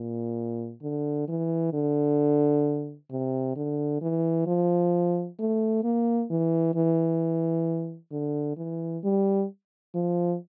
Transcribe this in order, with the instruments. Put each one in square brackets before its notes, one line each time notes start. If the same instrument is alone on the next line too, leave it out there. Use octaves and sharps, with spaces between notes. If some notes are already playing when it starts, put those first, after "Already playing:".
Already playing: [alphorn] A#2
D3
E3
D3
C3
D3
E3
F3
A3
A#3
E3
E3
D3
E3
G3
F3